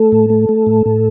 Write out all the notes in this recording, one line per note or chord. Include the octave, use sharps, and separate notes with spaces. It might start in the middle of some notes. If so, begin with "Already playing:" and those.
Already playing: A3 A4
A2
A3
A3
A2
A2